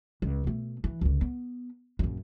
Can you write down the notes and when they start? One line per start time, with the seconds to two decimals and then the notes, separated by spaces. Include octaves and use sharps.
0.22 C#2
0.44 B2 A3
0.84 E3
1.01 C#2 D3
1.21 B3
1.99 A#1 F#2